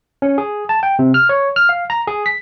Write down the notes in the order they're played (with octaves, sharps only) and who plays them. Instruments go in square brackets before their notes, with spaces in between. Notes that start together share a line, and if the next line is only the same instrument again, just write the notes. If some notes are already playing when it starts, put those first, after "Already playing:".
[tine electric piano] C#4
G#4
A5
G5
C3
F6
C#5
F6
F5
A#5
G#4
B6